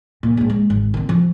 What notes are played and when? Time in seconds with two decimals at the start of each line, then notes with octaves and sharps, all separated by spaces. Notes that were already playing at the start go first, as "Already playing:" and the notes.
0.23 A#2
0.37 A#1 G#2
0.50 G#3
0.70 G#1
0.94 D#3 C4
1.09 F3